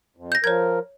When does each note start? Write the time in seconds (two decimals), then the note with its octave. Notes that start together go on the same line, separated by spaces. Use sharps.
0.17 F2
0.32 G6 A#6
0.44 F3 A#4 C#5 G#6